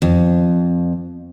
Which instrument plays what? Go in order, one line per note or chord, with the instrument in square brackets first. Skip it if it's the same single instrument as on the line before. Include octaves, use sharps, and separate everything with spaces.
[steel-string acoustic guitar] F2